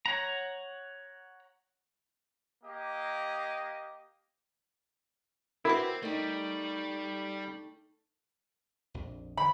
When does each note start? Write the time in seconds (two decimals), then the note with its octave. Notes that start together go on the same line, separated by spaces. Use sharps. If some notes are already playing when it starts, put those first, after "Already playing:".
0.06 C#5 F#5 A#5
2.63 A#3 G4 D#5
5.65 C4 E4 F#4 A#4 B4 D6
6.03 G3 A3 D#4
8.94 A#1 F2
9.37 D3 E3 B5